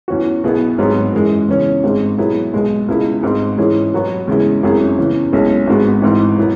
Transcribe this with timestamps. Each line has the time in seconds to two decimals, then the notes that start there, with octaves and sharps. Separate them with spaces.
0.08 E2 E3 C#4 F#4
0.44 B1 B2 B3 E4 G#4
0.78 G#1 G#2 F#3 B3 G#4
1.13 F#2 E3 G#3
1.48 E2 C#3 E3 C#4
1.84 G#1 G#2 G#3
2.18 B2 F#3 B3 E4 G#4
2.53 B1 B2 G#3
2.88 C#2 B2 G#3 E4 G#4
3.23 G#1 G#2 G#3
3.58 G#2 E3 C#4 E4 G#4
3.92 B2 F#3 B3 F#4
4.28 E2 C#3 G#3 E4 G#4
4.63 G#1 F#2 F#3 E4 G#4
4.98 E2 C#3 E3
5.33 B1 B2 G#3 C#4 E4
5.67 G#1 G#2 G#3 B3 F#4
6.02 G#1 G#2 E3 B3
6.38 B2 F#3 B3 E4